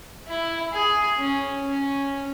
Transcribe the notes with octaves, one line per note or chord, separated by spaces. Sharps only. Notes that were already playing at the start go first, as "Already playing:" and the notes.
E4
G#4
C#4
C#4